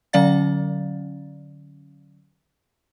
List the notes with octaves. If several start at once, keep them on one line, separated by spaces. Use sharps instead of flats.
D3 F#3 C#4 D5 F5 A6